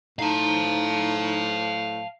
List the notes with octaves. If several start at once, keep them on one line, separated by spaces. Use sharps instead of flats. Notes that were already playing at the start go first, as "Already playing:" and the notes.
A2 D#4 F5 A5 A#5